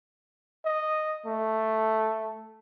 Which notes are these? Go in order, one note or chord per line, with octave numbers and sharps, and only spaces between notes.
D#5
A3